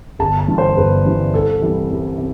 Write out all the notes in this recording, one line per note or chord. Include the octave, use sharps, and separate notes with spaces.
G1 A5
A5
G2 E3 G3
C5
G1 B4
G2 E3 G3
C2 A4
C3 E3 G3
C2
C3